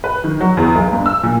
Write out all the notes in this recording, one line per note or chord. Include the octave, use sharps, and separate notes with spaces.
B4
D#3
F#3
E2
B1
G2
E6
A#2